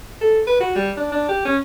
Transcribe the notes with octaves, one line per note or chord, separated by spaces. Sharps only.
A4
B4
F#4
G3
D4
D4
G4
C#4